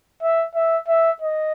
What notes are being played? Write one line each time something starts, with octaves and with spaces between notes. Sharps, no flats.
E5
E5
E5
D#5